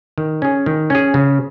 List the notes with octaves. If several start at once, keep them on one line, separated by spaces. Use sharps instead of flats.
D#3
C#4 G#4
D#3
C#4 G#4
C#3